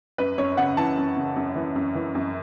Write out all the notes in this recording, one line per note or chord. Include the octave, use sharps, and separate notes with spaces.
F#2 B4
F#2 C#5
C#3 F#5
E3 A5
F#2
C#3
F#2
E3
F#2
E3
F#2